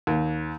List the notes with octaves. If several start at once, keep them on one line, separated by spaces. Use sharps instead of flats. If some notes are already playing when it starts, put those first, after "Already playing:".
D#2